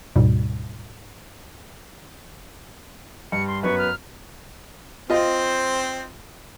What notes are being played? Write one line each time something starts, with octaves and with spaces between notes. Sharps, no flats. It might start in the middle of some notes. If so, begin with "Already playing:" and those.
D2 G#2 B2 G3
G2 C#7
C6
F#2 B3 B4 C#6
F6
C4 F4 C5 D#5